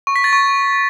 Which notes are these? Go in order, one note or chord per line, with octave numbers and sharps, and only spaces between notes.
C#6
B6
A6
C#6